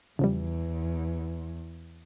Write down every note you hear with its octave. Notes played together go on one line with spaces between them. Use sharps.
E2 C#3 F3 G3